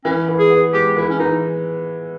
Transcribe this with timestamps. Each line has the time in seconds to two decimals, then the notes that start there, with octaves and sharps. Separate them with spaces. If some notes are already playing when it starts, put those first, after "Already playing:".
0.05 E3 C#4
0.29 E3
0.39 G#4
0.50 B3
0.73 G#3 G4
0.96 E3 E4
1.10 C#4
1.19 E3 D#4